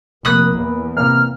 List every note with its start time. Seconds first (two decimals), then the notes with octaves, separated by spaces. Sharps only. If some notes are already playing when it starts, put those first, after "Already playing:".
0.25 F1 A#3 B5 D#6 F#6
0.56 E2
0.97 C3 A#3 F6